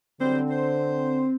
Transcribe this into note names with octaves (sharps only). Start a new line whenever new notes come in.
D3 F#3 G3 C4 C5
C5